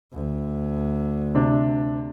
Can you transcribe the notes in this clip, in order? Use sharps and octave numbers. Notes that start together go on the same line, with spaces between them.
D2
C3 D4